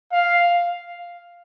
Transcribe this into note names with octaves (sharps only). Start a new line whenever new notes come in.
F5